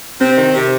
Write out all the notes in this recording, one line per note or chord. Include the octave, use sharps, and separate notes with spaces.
C3 C4
D#3
C3